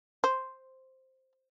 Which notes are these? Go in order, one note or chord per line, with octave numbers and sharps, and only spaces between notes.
C5